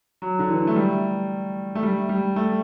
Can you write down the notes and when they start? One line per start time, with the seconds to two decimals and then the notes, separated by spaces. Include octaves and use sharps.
0.22 F#3
0.39 D3
0.48 E3
0.67 A3
0.76 G3
1.75 A3
1.83 G3
2.09 G3
2.36 A3